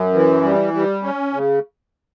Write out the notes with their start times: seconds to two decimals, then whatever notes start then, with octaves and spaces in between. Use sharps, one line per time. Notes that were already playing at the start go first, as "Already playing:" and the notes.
Already playing: F#2
0.13 E3
0.43 G3
0.73 G3
1.03 C#4
1.33 C#3